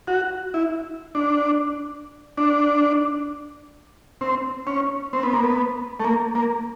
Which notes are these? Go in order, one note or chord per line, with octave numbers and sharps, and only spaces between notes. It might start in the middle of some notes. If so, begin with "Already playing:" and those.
F#4
E4
D4
D4
C4
C#4
C4
B3
A#3
B3
A3
A#3
A#3